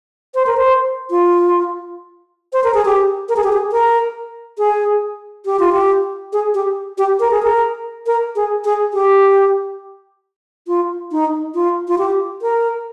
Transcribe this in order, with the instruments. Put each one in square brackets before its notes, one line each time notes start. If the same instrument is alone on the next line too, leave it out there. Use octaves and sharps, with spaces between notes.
[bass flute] C5
A#4
C5
F4
C5
A#4
G#4
G4
A#4
G#4
G4
G#4
A#4
G#4
G4
F4
G4
G#4
G4
G4
A#4
G#4
A#4
A#4
G#4
G#4
G4
F4
D#4
F4
F4
G4
A#4